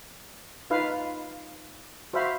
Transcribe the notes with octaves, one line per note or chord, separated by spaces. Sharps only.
D#4 F4 B4 F5
F#4 C5 E5 F5 B5